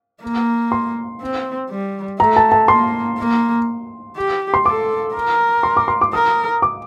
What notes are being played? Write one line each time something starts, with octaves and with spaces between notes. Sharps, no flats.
A#3
C6
C4
G3
A3 A#5
A5
A5
A#3 C6
A#3
G4
C6
A4 D6
A#4
C6
D6
C6
D6
A#4 D#6
D6